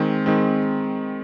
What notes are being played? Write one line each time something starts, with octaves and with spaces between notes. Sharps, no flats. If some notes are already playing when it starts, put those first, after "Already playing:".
Already playing: D#3 G#3 C4
D#3 G#3 C4